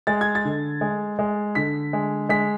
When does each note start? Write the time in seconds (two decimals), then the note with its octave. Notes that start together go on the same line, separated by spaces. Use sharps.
0.07 G#3 A6
0.21 G#6
0.35 A6
0.45 D3
0.81 G#3
1.19 G#3
1.55 D3 B6
1.93 G#3
2.29 G#3 B6